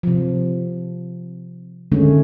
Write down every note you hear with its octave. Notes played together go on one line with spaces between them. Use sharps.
C3 F3
D3 D#3 G#3 A3 C#4